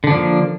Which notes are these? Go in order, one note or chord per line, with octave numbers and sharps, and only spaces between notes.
D3 F3 A#3 D4